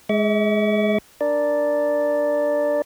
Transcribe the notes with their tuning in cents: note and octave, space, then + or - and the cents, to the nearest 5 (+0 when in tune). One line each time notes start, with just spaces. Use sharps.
G#3 +10 E5 -40 C#6 +45
D4 +0 A#4 +0 D5 +0